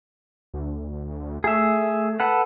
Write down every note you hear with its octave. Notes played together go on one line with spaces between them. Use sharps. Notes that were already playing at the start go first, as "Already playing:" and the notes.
D2
A3 G#4 E5
A4 B4 F#5